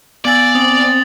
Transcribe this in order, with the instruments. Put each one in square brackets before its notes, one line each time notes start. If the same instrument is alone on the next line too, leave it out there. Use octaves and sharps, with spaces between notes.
[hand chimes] B3 G#5 E6 [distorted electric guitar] D5 [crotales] A6 F#7
[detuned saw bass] C4 [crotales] D#6